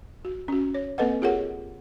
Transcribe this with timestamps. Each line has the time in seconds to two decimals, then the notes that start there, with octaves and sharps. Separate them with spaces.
0.25 F#4
0.48 C#4 F#4
0.74 C#5
0.98 A#3 C4 A4 B4 D#5 F#5
1.22 F4 G4 G#4 A#4 C#5 F#5